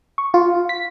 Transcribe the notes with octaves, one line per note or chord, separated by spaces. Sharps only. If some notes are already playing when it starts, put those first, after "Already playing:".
C#6
F4
B6